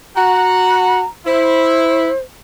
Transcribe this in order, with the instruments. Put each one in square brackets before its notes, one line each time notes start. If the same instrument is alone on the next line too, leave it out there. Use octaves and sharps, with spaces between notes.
[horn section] F#4 F#5 [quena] A#5
[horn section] E4 [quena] C5